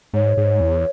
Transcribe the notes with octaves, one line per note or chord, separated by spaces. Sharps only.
G#2 C#5
G#2
E2